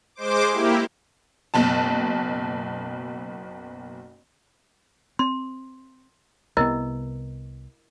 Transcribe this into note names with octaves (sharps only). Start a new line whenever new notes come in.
G#3 C5 D6
A#3 E4 G4
F#1 B1 A5
C4 C6
C2 C3 B3 E4 A#4 D#5